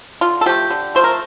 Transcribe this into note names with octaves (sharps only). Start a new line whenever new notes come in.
D3 F4
A4
F3 A3 G4
D3
F3 A3 C5
A#4